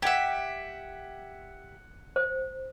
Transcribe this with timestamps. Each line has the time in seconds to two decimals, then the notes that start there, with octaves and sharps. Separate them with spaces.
0.02 G4 E5 F#5 G#6
2.16 C5